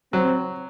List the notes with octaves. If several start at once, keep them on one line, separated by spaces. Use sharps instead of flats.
F#3 C4